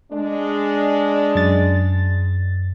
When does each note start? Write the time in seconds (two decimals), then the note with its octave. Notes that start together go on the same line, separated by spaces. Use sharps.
0.12 G#3 D4
1.35 F#2 A6